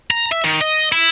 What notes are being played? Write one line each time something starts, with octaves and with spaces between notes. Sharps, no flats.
A#5
E5
D#3
D#5
E4